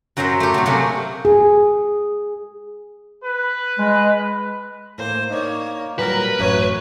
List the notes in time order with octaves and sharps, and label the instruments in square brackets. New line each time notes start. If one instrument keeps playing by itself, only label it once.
[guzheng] F#2 F#3 A#4 C5 E5
A3 G4
C3 F#3
C3 F#3 A3 A#3 F#4 G#4
[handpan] G#4
[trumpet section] B4
[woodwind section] G#3
[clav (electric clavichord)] A2 A#3 [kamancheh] C5
[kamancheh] A#3 C#5 [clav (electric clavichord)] D#4 D5
[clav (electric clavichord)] A#2 F#3 G3 [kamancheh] A#4 [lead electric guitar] B4
[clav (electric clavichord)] A1 F#2 E5 [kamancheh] C#5